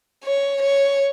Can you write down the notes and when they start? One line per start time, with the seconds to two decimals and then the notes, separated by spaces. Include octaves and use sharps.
0.24 C#5
0.62 C#5